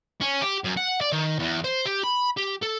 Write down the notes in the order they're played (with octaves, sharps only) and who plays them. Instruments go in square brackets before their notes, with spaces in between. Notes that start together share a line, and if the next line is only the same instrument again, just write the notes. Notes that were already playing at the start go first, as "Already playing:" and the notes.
[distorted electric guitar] C#4
G4
F#2
F#5
D5
D#3
E2
C5
G4
B5
G4
A4